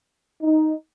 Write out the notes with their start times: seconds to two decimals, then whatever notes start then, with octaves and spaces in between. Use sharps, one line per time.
0.42 D#4